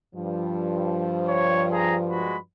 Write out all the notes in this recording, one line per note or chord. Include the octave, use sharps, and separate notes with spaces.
G2 F3
C#5
G#4 A#5
G#3 F#4 B5